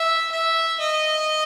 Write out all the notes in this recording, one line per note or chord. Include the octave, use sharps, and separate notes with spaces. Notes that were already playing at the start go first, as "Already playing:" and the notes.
Already playing: E5
E5
D#5